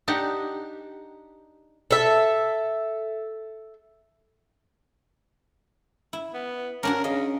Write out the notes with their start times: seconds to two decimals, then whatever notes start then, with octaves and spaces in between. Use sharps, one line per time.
0.08 D4 D#4 G4 F#5
1.91 A4 E5
6.13 E4
6.34 B3
6.83 C#4 D4 F#4 A#4
7.04 C#3 D#5